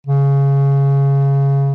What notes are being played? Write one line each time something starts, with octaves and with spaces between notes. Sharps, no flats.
C#3